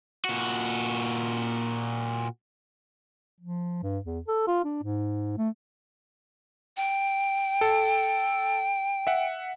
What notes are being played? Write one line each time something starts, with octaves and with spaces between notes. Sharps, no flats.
A#2 F#4
F3
G2
E2
A4
F4
D4
G#2
A3
G5
A4
E5 F#5